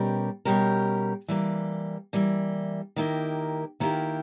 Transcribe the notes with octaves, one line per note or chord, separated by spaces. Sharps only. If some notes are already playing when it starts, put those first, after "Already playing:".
Already playing: B2 G3 C#4 G4 A#4
B2 G3 C#4 G4 A#4
E3 G3 A#3
E3 G3 A#3
D#3 A#3 E4 G4 A#4
D#3 A#3 E4 G4 A#4